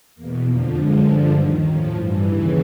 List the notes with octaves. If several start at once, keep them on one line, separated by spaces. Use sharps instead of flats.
E2 B2 A#3
F2 D3 F3 A#3
F#2 D3 F3 G#3
G2 D3 F3
D#2 D#3 G3
A2 F3 C#4
G2 E3
D#2 C#3 E3